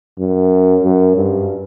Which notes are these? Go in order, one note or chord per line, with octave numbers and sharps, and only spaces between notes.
F#2
F#2
G2